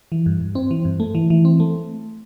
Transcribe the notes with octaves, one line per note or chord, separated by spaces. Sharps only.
E3
G2
G2
C4
E3
G2
A3
E3
E3
C4
A3